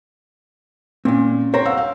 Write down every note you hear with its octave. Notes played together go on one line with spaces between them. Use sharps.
A#2 C4 C#4
C5 C#5 G5 A#5
F5 F#5 E6
F5